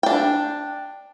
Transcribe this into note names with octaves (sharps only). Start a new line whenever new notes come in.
D4 G5